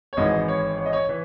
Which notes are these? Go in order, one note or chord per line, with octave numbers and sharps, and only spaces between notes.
C#5
G#1 G#2 E3 D#5
C#5
C#5
D#5
C#5
E3 B4